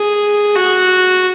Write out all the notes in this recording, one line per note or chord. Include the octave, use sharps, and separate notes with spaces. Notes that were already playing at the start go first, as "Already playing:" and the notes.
Already playing: G#4
F#4